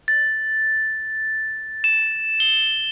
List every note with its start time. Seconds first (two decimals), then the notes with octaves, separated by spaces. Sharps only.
0.08 A6
1.84 E7
2.40 G7